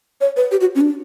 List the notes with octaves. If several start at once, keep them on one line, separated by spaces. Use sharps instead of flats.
C#5
B4
G4
F#4
C#4
D4